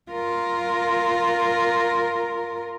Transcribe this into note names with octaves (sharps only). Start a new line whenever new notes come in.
F4 A#4